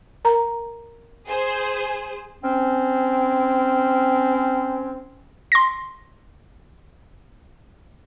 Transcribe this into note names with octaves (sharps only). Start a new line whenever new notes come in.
A#4 A#5
G#4 C5
C4 C#4
C6 A#6